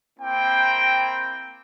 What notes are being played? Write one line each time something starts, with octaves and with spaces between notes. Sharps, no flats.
A#3 C4 E4 G5